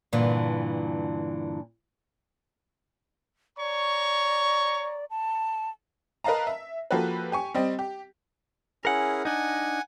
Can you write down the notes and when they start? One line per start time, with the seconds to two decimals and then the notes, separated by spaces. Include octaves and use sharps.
0.12 G2 A#2 D3 E3
3.58 C#5 D5 A#5 C#6
5.10 A5
6.24 A#4 B4 D#5 F5 A5 A#5
6.47 E5
6.91 F3 A#3 F#4 G4 A4 B4
7.32 G4 G#5 C#6
7.54 G3 C4 D#5
7.79 G4
8.85 C#4 E4 G#4 A#4 F#5
9.25 D4 D#4 F#5 G#5